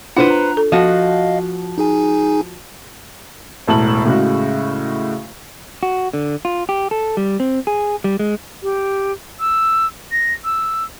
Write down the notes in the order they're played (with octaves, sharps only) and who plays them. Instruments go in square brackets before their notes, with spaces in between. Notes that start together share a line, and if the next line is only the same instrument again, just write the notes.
[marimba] D4 F4 [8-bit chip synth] E4 [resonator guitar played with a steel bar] B4 C5 F#5
[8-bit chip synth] A#5
[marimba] A4
[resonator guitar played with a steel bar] F3 F#4 [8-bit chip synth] D#5 F5
[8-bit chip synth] D#4 G#4 G#5
[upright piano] E1 A2 A5 F#7
A2 C#3 G#3 F#4
[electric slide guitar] F#4
D3
F4
G4
A4
G3
C4
G#4
G3
G#3
[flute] G4
E6
A#6
E6